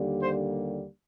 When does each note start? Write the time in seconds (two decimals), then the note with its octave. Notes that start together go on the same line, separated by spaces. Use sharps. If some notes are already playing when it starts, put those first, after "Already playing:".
Already playing: D#2 D3 G3 A#3
0.21 C5